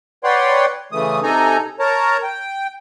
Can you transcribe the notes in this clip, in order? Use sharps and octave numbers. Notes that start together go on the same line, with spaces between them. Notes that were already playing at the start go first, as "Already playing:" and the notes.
B4 C#5 D5 F#5 G5 C6
C#3 E3 A3 D#6
C3 D#4 A4 G#5 A#5
A#4 C#5 A5 A#5
G5